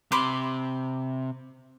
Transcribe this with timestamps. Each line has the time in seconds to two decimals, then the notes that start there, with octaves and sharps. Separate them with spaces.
0.12 C3 B5 C6 D6